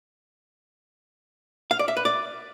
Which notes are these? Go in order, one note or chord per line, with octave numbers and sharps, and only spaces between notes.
F5
D5
E5
B4
D5